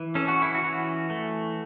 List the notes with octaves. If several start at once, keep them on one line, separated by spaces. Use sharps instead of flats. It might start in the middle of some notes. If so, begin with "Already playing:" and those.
Already playing: E3
C#4 A4
F#4
E4
F#4
E3
A3